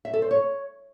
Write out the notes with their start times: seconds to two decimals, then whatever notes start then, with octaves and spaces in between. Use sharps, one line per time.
0.05 E5
0.14 A4
0.22 C5
0.31 C#5